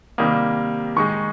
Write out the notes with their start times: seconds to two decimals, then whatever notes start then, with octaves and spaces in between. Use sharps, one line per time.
0.18 C3 D#3 G3 A#3 D#6
0.96 D#3 G#3 D#4 C#6